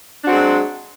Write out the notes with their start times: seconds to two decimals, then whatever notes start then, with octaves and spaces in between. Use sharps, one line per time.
0.22 D4
0.25 F#4
0.28 C4
0.31 G#3
0.33 F#3